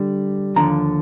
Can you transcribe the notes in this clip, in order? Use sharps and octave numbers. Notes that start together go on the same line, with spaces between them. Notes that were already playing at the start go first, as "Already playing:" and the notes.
Already playing: D3 G3
D#2 D3 F3 A#5